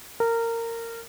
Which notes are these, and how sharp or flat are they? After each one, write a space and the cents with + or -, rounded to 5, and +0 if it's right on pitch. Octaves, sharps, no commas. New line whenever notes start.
A#4 -20